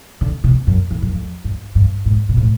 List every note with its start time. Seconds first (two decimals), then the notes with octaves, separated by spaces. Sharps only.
0.21 D3
0.44 C3
0.67 F#2
0.91 E2
1.02 F#2
1.14 F2
1.44 G2
1.75 G2
2.06 G#2
2.29 A#2
2.37 A2